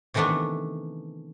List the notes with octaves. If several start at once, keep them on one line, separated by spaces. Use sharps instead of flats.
C3 D#3 E3 A3 B3 D4